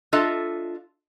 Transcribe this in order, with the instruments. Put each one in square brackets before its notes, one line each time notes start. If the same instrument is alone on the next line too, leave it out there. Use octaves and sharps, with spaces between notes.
[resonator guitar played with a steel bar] D4 F4 A4 D#5 E5 A#5